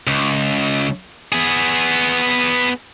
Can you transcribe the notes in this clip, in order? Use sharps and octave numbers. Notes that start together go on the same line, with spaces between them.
C#2
B3 G#4